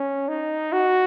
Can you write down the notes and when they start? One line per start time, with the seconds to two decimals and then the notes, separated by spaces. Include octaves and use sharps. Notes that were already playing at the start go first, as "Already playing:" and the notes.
Already playing: C#4
0.29 D#4
0.73 F#4